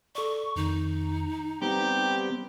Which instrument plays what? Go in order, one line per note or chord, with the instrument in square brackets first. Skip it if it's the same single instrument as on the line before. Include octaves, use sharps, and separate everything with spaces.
[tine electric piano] A4 D5 [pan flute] C#6
[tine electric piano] F2 D#3 [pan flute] D#4
[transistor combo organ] G3 B3 C4 [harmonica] G4 [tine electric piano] A#5